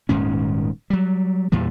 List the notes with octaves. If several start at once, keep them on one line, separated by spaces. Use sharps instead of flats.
D#1 G#2 D#3 C#4
F#3 G3
E2 A#2 E3 G3